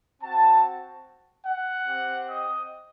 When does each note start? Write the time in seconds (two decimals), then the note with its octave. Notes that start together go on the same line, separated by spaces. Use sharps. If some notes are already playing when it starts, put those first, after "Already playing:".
0.21 C4 F#4 A5
1.46 F#5
1.87 C4 G4
2.28 D#5